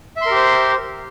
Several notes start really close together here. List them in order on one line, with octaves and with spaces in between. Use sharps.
E5 C6 A#4 G4 C5